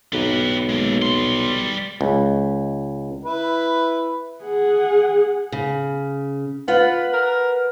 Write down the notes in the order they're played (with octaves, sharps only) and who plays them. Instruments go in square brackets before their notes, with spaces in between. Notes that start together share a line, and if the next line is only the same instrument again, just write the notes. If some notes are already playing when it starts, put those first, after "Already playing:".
[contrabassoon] B1 [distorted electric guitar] G4 B4
[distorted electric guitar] G#3 A#3
G3 C6
[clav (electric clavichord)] C#2
[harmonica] E4 B4
[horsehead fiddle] G#4 F#5
[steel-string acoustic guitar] C#3
[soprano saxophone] F4 [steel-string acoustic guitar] B4 F#5
[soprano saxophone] A#4